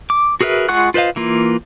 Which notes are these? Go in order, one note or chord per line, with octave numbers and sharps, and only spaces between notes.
D6
F#4 G#4 A#4 B4 E5
G#3 F4 F#5 C#6 F#6
F4 B4 C5 D#5 F5
E3 A#3 F4